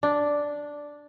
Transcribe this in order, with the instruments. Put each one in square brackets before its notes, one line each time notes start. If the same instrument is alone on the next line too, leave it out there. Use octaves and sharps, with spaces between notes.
[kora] D4